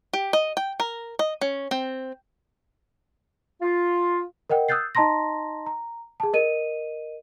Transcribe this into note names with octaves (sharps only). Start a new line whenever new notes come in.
G4
D#5
G5
A#4
D#5
C#4
C4
F4
A#4 D#5 F#5 G5
D#6 E6 F#6 G6 A6 C7
D#4 D#5 A5 A#5 C6 A#6
A#5
G#4 A5
A#4 D#5 D#7